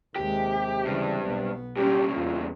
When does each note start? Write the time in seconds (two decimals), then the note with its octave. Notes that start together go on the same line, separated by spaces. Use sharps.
0.16 D#2 C3 G#3 G4
0.85 G2 C#3 E3
1.27 B1 B3
1.77 G2 C#3 G3 C#4 G4
2.16 E2 F4